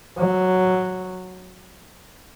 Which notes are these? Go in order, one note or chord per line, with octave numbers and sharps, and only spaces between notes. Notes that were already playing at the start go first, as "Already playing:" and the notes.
F#3